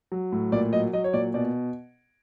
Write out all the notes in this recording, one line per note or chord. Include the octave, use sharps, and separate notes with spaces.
F#3
A2
A#2 D5
F#3 D#5
F#3 D#5
C#5
A#2 D5
B2 D5